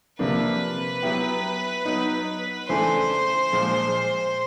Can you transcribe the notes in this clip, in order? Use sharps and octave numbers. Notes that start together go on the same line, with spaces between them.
C3 F3 A#3 D4 B4
F#3 B3 E4 G4
F#3 B3 D#4
C#3 E3 A3 D4 C5
A#2 F3 G#3